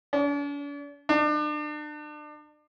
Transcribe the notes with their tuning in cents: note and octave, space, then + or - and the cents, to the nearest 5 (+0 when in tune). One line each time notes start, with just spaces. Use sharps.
D4 -45
D4 +35